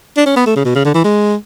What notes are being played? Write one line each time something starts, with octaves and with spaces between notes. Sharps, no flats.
D4
C#4
B3
A3
C#3
B2
C#3
D3
E3
G#3